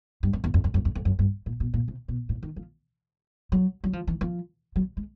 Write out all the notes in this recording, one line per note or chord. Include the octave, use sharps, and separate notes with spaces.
G2
F#2
E2
F2
F2
F#2
F2
F2
F#2
G2
A#2
B2
A#2
C3
B2
A2
D#3
F3
F#3
F#3
F3
E3
F3
F#3
G#3